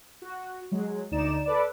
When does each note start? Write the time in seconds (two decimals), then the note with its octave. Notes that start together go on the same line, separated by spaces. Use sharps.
0.22 F#4
0.71 F#3 G#3
1.11 D2 D#4 D5 E7
1.46 A4 B4 D5